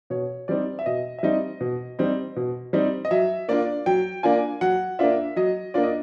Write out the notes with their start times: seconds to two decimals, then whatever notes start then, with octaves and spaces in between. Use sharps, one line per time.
0.10 B2 C#5
0.48 G3 C4 D#4 D5
0.79 E5
0.86 B2 D#5
1.19 E5
1.23 G3 C4 D#4 D#5
1.61 B2
1.99 G3 C4 D#4
2.36 B2
2.73 G3 C4 D#4
3.05 D#5
3.11 F#3 E5
3.48 A#3 D4 F4 D5
3.86 F#3 G5
4.23 A#3 D4 F4 G#5
4.61 F#3 F#5
4.99 A#3 D4 F4 E5
5.36 F#3 D#5
5.74 A#3 D4 F4 D5
5.83 D#5